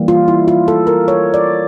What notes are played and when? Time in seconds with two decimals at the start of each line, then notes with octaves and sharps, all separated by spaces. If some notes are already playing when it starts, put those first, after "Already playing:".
Already playing: E3 G3 A#3
0.08 F4
0.28 E4
0.48 F4
0.68 A4
0.87 A#4
1.08 C#5
1.34 D5